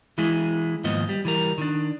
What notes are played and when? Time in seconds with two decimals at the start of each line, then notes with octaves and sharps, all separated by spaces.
0.18 E3 G#3 E4 G#4
0.84 D#2 G#2 F3 B3 D#5
1.09 G3
1.25 E3 G3 A#4
1.58 D#3 D4